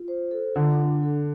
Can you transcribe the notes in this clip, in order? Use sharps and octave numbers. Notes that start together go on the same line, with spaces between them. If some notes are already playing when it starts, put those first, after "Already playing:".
Already playing: F4
C5
A4
D3 F4
D4
A4